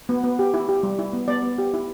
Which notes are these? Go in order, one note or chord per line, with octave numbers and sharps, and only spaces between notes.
B3
B3
G4
E4
G4
G3
E4
B3
B3 D5
B3
G4
E4